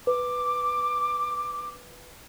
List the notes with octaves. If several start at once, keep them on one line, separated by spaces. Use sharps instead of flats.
B4 D6